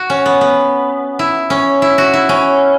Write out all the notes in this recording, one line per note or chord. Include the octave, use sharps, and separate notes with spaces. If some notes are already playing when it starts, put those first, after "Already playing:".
Already playing: F#4
C#4
B3
B3
E4
C#4
E4
F#4
E4
C#4